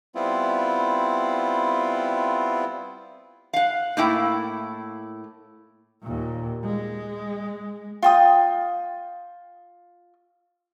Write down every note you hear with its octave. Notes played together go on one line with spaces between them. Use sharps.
G3 B3 C4 E4 F4
F5 F#5
A2 A#3 E4 G5
D#2 A#2
G#3
F4 G5 D#6